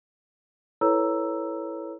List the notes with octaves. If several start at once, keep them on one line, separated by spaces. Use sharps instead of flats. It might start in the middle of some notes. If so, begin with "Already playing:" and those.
E4 A4 B4 C#5 A#5 E6